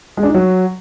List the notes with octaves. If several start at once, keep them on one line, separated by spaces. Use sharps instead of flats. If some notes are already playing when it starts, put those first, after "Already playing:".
G#3
D4
D#4
F#3